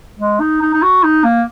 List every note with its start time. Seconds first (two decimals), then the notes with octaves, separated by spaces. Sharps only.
0.19 G#3
0.40 D#4
0.62 D#4
0.73 D#4
0.83 F#4
1.04 D#4
1.24 A#3